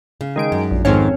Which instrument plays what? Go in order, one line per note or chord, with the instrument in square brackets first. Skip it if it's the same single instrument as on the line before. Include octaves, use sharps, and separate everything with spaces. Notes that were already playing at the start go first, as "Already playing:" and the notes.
[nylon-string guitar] C#3
[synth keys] D#3 G#3 D7
[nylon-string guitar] F#2
[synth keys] A#1
[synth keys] F2 C4 C#4 [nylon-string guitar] G#2 D#3